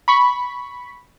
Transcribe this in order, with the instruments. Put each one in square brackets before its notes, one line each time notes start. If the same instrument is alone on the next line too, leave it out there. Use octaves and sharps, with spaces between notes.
[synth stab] B5 C#6 B6